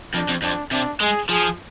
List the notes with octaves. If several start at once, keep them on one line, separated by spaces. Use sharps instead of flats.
F2 D4
F2
F2 D4
C3 D4
G#3 G#4
F3 G#4